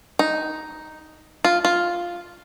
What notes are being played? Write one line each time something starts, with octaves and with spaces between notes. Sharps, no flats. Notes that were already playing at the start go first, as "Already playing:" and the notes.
D#4
F4
F4